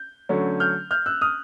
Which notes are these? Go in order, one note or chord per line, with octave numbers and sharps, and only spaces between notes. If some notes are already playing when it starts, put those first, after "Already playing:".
Already playing: G6
D3 F#3 A3 C#4
F6 G6
F6 G6
E6 F#6
D#6 F6